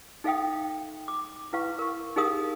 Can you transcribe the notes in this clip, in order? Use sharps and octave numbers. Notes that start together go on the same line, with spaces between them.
D#4 A4 E5 F5 G5 D#6
D6
E4 B4 F5 C#6
A#4 C#6
D#4 G4 G#4 A#4 F5 D#6